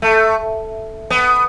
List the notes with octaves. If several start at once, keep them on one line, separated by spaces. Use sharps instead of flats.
A3
B3